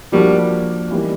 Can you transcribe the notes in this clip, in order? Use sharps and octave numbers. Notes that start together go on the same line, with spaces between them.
F3 G3 A#3 D4 F#4
E3 G3 A#3 D#4